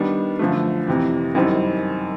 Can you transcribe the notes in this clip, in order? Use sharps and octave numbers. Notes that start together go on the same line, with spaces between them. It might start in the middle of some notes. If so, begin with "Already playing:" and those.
Already playing: D#3 G3 B3 D4
F#2 D3 F3 A3
F2 C3 E3
F#2 D#3 G3 C4 E4